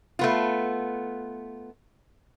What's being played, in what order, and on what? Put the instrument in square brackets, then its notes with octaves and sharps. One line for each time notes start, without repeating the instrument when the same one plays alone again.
[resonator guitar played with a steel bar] A3 B3 F4